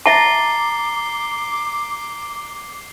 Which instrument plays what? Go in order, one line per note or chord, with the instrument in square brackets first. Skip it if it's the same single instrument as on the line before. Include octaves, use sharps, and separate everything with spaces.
[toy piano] E5 A5 [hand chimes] A#5 A6 [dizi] D6 [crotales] C7 G7